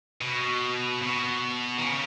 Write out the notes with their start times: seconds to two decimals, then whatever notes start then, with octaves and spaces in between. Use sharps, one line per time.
0.21 B2
1.02 B2
1.78 D#3
1.83 C#3